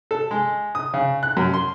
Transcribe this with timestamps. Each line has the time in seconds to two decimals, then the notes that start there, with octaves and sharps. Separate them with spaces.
0.11 A4
0.31 G#3
0.75 D#6
0.94 C#3
1.23 F#6
1.37 F#2
1.54 C6